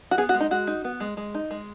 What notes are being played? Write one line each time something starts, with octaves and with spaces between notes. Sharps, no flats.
F#4
B3 G#4
F#4
G#3
D#4
G#3 F#4
D#4
B3
G#3
G#3
D#4
G#3